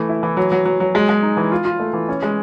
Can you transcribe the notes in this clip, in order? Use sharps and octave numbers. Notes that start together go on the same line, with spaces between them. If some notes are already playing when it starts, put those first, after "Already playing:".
Already playing: E3 A3
E4
E3
F#3
F#3
F#3
F#3
G#3
G#3
D#4
E3
F4
F4
A3
E3
C#4
G#3